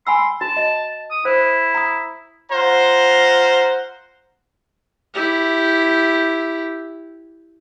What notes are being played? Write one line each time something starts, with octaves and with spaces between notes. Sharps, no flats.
G#5 B5 C6 E6
F#4 A5
D#5
D#6
E4 C5
A#5 D#6
F4 C5 F#5 A#5
E4 G4